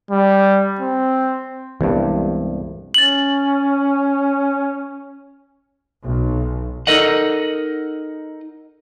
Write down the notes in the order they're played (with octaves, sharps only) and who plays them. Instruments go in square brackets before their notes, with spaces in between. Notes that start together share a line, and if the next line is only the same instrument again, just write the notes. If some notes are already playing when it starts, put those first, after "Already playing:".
[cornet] G3
C4
[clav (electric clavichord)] C2 G2 [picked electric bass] E3 G#3 B3
[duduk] C#4 [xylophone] A6 F#7
[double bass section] B1
[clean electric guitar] D#4 A4 A#4 D#5 F#5